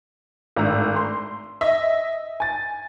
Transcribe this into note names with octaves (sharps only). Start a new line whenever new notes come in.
G#1 A2 D4 A#5 E6
C6
D#5 E5
G#5 A6